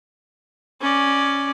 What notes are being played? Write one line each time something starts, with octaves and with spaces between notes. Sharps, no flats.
C#4 D5